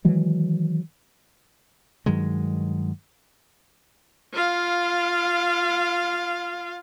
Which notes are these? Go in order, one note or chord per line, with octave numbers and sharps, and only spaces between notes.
D#3 E3 F#3 G#3
G2 D#3 F#3 G#3
F4 F5